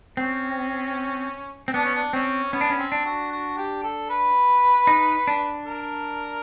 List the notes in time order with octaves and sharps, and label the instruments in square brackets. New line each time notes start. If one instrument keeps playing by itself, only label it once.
[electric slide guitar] C4 [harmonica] C#4
[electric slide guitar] C4
[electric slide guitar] B3 [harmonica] D4
[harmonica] C#4
D4
[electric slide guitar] C4 [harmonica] C#4
[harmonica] B3 [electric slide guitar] C#4
[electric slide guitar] D4
C#4
[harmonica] C4
[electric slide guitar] D4
[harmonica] F#4
F#4
G4
A4
B4
[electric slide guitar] D#4
D4
[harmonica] A#4